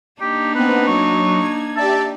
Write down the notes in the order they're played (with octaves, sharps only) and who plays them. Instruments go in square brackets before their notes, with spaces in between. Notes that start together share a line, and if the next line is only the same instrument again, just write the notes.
[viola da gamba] A#3 D4 D#4 [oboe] G4
[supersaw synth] B3 C4 [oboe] B4
[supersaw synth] F#3 [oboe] C#6
[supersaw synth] G#6
[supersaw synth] G4 D5 E5 [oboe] A5